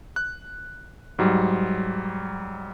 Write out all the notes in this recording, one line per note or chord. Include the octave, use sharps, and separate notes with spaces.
F#6
G#2 F#3 G3